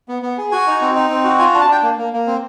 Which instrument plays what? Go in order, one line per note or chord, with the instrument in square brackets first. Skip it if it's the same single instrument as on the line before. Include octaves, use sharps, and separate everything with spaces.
[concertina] B3
B3
G#4
F#4 G#5
D#4
C4
D#4
C4
F#4
F4 G#5
D4
A5
D4 G5
A#3
A#3
A#3
C4